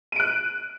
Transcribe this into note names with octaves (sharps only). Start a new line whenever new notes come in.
F#6 D7 D#7